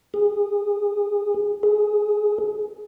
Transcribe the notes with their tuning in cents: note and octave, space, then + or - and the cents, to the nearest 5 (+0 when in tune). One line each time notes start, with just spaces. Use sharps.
G#4 -20
G#4 +15